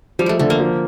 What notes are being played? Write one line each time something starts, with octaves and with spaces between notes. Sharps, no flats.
F3 G3
G#3 A3
D3 A3
A#3
F3